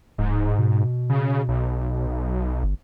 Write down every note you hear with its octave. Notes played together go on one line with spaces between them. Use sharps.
D1 G#2
B2
C#3
B1
G1